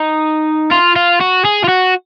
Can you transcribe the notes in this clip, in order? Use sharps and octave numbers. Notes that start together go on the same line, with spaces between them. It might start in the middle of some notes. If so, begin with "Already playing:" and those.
Already playing: D#4
F4
F4
F#4
G#4
F4
F#4